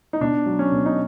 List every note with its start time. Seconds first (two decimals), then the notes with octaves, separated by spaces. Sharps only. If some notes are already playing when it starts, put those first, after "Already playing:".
0.13 D#4
0.21 B2 D4
0.46 F#3
0.59 C#4
0.72 B2
0.86 D#4